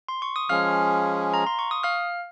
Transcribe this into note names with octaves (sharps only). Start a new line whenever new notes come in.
C6
C#6
D#6
F3 G#3 C#4 G#4 F5 F6
A#5
C6
C#6
D#6
F5 F6